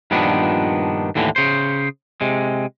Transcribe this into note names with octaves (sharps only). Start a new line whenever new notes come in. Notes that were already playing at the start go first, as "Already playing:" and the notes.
G2 A#2 D#3 F3 B3 D4
D#2 A2 D3 E3
C#3 C5
C3 G#3